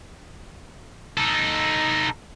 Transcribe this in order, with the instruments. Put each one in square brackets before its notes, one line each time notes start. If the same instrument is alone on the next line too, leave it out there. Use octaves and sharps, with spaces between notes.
[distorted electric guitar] D#4 A4